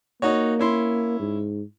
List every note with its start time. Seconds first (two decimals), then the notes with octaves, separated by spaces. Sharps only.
0.22 A#3 D#4 F#4 C#5
0.59 C#4 E4 C6
1.19 G#2